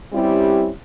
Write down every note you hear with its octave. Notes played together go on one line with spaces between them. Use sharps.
G3 C4 C#4 E4 G4